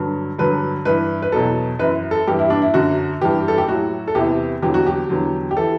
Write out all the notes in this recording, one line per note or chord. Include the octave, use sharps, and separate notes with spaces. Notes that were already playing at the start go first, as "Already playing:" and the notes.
Already playing: G2 D3 F#3
G2 D3 F#3 B4
G2 E3 B4
B4
E2 B2 F#3 A4
F#2 E3 B4
A4
G2 E3 G4
E4
D4
E4
F#2 D3 F#3 F#4
G2 E3 G4
A4
G4
A2 F#3 F#4
A4
E2 C3 E3 G4
E2 D3 F#3 G4
F#4
G4
E2 D3 F#3
G4
E3 A4